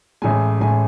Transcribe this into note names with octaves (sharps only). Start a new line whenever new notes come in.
A1 A2 G#3 G#5
A1 A2 G#3 G#5